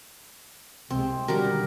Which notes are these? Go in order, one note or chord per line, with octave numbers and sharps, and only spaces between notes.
C2 C3 G#3 C4
B2 D3 D#3 F#3 G3 A#4